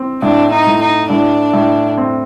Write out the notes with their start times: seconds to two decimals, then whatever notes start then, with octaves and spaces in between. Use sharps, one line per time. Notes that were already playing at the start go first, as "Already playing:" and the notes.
Already playing: C4
0.22 A2 D4
0.52 D#4
0.66 A2
0.81 D#4
1.10 A2 D4
1.53 A2
1.97 C4